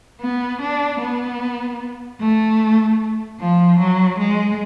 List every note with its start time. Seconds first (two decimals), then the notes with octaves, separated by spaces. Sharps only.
0.21 B3
0.61 D4
1.00 B3
2.20 A3
3.40 F3
3.79 F#3
4.19 G#3